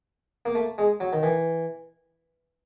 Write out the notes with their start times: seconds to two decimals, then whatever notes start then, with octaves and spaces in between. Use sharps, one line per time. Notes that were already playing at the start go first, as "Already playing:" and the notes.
0.46 A#3
0.55 A3
0.78 G#3
1.00 F#3
1.13 D#3
1.23 E3